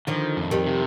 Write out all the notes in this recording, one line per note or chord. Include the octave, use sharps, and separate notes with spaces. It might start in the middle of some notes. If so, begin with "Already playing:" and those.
D3 D#3 F3
F2
D#3 G3
C3